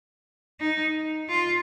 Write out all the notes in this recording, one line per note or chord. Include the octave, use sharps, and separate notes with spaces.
D#4
F4